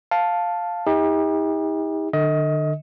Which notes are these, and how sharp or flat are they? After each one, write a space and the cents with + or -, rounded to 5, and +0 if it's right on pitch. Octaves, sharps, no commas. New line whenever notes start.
F5 +5 A5 +0
D#4 +40 G4 +40
D3 +30 D#5 +25